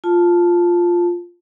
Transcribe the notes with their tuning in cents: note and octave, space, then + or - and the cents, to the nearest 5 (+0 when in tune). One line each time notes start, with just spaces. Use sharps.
F4 +0 A5 +0